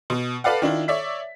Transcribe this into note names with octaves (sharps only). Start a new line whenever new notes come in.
B2
A4 B4 D5 F5 F#5
D#3 D4 E4 F4
C#5 D5 E5 B6